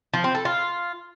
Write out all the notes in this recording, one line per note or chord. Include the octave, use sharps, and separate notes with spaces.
F3
C4
A4
F4